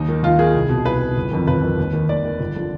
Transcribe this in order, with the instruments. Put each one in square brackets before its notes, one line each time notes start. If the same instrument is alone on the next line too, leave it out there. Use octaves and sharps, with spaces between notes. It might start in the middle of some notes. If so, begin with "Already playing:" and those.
Already playing: [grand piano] D#2 D#4
D#3
D#2 F4
D#3 G#4
C2
B2
C2 B4
B2
G1
F2 D#3
G1 B4
F2 D#3
D#2
D#3
D#2 D5
D#3
G1
D3 F3